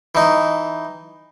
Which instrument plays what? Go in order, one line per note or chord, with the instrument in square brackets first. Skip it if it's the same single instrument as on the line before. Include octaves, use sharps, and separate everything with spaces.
[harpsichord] E3 D#4